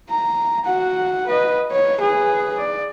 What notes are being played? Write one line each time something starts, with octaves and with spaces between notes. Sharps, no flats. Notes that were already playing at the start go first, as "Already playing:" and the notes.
A#5
F#4 F#5
B4 D#5
C#5
G#4 B4
D5